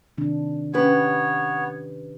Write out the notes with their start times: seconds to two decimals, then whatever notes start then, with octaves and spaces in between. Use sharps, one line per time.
0.18 C3 D#3 D4
0.73 B3 C#4 G4 B4 C#5